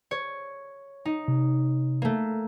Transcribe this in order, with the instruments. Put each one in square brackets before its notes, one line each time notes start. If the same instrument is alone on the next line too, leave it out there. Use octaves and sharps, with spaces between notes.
[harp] C#5
D#4
[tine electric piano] C3
[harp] A3 A#3